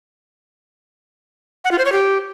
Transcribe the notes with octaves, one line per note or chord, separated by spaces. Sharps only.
F#5
F4
C5
C#5
G4